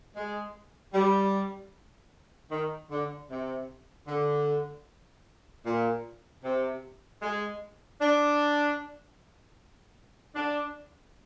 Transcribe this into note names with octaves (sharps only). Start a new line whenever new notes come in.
G#3
G3
D#3
D3
C3
D3
A#2
C3
G#3
D4
D4